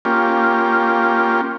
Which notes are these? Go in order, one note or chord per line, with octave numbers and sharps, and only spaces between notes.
A#3 C#4 F4 G4